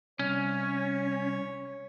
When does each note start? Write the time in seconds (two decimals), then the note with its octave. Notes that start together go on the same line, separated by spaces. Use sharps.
0.19 C2 C#4 C#5